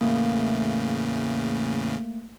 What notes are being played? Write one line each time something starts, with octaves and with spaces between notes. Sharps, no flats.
E2 A2 C#3 A3 A#3